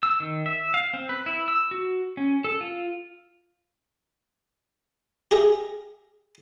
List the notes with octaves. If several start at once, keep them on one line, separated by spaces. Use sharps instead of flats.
E6
D#3
E5
F5
C4
B4
E4
E6
F#4
C#4
A4
F4
G4 G#4 A#4 E5